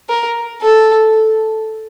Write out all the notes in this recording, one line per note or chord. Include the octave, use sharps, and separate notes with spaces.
A#4
A4